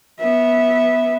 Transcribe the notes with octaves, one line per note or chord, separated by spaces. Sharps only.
B3 E5